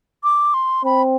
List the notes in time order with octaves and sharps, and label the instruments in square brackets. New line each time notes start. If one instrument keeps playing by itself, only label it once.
[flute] D6
C6
[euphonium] C4 [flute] B5